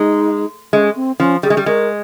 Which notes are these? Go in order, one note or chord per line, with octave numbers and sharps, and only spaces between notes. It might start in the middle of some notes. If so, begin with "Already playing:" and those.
Already playing: G#3 D#4
G#3 C#4
C4
F3 C#4
G3 G#4
G#3
G3
G#3 A#4